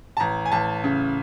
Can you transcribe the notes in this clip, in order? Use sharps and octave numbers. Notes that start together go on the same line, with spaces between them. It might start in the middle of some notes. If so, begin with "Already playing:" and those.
A5
A1 A#5
G#5
A1 A5
C#3